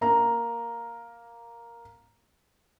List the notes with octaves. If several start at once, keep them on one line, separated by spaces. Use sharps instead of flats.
A#3 A#5